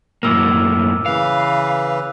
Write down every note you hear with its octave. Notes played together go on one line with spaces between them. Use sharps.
F#2 A2 A#3 D6 E6 F6
C#3 E3 B4 F5